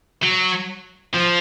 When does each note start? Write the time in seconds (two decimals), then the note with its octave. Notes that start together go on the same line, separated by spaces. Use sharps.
0.23 F#3
1.14 F3